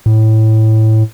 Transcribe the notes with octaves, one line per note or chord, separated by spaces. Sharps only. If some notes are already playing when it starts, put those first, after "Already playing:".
A2